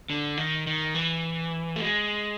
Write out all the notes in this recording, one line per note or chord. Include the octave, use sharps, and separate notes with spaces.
D3
D#3
D#3
E3
A3
G#3